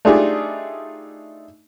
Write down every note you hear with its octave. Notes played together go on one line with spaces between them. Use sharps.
A3 D4 D#4 F4 G4 G#4